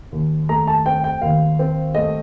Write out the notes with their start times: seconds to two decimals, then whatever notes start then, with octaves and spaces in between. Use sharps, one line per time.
0.12 D#2
0.49 A3 A#5
0.67 A5
0.86 C4 G5
1.04 G5
1.22 D#2 F5
1.59 C4
1.95 A3 D#5